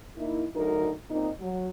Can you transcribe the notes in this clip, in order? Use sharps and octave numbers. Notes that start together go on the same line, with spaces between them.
A#3 D#4 E4
D2 D3 F#3 D#4 A#4
A#2 C4 D#4
F#3